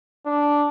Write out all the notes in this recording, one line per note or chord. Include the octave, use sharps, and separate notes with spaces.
D4